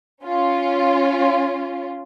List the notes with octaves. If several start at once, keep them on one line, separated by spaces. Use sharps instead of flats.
C#4 F4